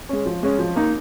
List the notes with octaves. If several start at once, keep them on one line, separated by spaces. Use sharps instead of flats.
G#3 C#4
F3
G#3 C#4
F3
A#3 D#4